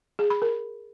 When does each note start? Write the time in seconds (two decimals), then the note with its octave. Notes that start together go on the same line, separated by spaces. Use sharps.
0.19 G#4
0.30 B5
0.42 A#4